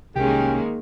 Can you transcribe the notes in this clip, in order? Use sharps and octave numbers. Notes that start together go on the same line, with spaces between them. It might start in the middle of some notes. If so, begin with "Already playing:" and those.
C2 D#3 G#3 A#3 C#4 G4